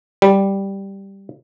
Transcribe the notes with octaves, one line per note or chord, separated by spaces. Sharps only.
G3